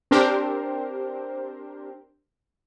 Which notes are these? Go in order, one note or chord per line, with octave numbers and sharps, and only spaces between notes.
C4 D4 G4 A#4 C5